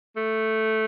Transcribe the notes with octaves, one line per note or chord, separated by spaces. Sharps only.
A3